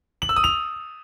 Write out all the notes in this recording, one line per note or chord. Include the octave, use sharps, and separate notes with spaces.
F#7
E6
D#6
F7